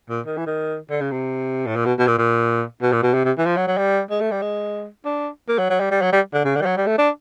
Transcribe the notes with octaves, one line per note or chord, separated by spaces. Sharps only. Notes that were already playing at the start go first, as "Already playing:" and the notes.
A#2
D#3
E3
D#3
D3
C#3
C3
A2
A#2
B2
B2
A#2
A#2
B2
A#2
B2
C3
C3
E3
F3
F#3
F#3
G3
G#3
A3
G3
G#3
D4
A#3
F#3
F#3
G3
G3
F#3
G3
D3
C#3
D3
G3
F#3
G3
A3
D4